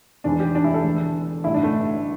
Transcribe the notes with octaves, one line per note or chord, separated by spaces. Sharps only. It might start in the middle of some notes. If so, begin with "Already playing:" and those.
E1 E2 E3 D4
G4
D4
E4
A4
E1 E2 D3
A1 G2 D3 E4
D4
A3